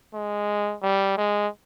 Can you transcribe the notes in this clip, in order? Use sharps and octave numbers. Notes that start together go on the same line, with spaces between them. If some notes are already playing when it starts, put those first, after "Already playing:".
G#3
G3
G#3